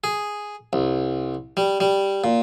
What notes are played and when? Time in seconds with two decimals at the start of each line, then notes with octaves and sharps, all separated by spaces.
0.04 G#4
0.73 C2
1.57 G3
1.80 G3
2.24 A#2